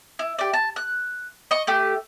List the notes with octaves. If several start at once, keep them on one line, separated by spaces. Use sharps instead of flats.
E4
G4 D5
A5
F#6
D#5 C#6
A3 G4